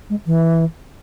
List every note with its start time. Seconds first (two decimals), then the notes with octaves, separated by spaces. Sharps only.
0.10 G#3
0.26 E3